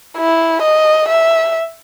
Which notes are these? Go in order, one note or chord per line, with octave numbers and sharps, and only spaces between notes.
E4
D#5
E5